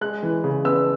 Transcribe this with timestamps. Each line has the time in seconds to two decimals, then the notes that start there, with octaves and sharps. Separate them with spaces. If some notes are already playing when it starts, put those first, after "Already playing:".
0.01 G#3 F#6
0.23 E3
0.44 C#3
0.65 B3 E6